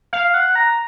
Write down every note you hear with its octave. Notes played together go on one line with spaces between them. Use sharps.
F5
F#5
A#5